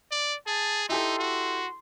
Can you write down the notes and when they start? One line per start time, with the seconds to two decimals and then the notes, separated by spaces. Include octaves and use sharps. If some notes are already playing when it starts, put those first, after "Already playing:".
0.12 D5
0.47 G#4 A5
0.89 D#4 E4 G4 A4 C6
1.19 F#4